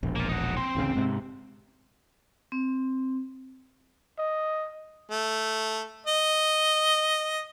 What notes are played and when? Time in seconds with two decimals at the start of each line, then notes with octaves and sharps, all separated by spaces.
0.03 E1 A#1
0.16 A#3 F4
0.29 D#4 F#4
0.57 C4 C6
0.75 A1 D2 C#3
0.96 G#2 C3
2.52 C4
4.19 D#5
5.10 A3
6.06 D#5